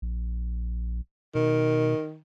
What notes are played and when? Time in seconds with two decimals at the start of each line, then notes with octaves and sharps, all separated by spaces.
0.02 A#1
1.35 B2 D#3